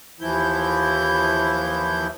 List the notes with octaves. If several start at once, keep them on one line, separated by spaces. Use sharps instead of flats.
D#2 E3 F3 E4 G6